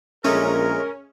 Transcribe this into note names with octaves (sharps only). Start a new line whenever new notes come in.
A#1 G#3 A3 C#4 A#4